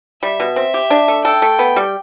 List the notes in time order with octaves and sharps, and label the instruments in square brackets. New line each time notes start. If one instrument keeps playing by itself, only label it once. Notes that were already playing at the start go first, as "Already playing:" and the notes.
[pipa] G3 [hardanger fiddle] E5
[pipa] B2
[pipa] C4 [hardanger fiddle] E5
[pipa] G4
D4
A3
[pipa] A4 [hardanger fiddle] G5
[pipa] A3
B3
G3